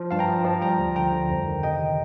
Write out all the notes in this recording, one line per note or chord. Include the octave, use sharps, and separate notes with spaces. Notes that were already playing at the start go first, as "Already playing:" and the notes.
Already playing: F3
G2 F5 A5
G5 A#5
F3
F3
G3 G5 A#5
D2
D3 G5 A#5
D3
F2
D#3
C3 D#5 G5